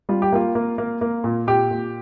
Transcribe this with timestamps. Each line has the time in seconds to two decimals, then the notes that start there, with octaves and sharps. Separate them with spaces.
0.09 G3 F4
0.22 G4
0.32 A#3 F4
0.55 A#3
0.78 A#3
1.01 A#3
1.24 A#2
1.47 A#2 G4
1.71 A#2